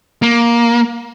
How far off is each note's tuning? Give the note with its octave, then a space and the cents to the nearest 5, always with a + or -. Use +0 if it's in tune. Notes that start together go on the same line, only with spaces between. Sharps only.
A#3 +10